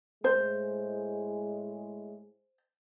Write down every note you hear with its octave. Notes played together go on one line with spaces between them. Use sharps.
A2 G#3 C5